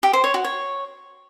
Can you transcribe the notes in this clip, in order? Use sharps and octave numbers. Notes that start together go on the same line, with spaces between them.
G4
C5
C#5
F#4
C#5